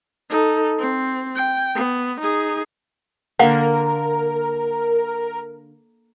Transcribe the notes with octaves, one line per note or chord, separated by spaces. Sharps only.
D#4 A4
C4
G5
B3
D#4 G#4
D3 A#3 A#4 F5 F#5